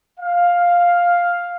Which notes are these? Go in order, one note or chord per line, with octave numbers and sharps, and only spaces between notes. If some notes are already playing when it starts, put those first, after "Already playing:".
F5